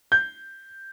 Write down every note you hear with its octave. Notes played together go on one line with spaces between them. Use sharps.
G6